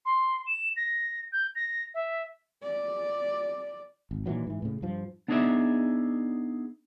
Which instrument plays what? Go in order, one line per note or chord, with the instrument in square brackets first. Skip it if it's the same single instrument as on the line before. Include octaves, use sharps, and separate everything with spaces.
[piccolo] C6
E7
A#6
G6
A#6
E5
[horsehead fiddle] D5
[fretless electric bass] G#1
A#2 D#3 E3 F#3
G#2 E3
A2 C#3
G2 F3
[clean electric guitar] B3 D4 D#4 G#4 D5 E5